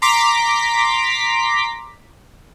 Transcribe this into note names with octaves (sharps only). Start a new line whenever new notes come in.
A#5 C6 D6 B6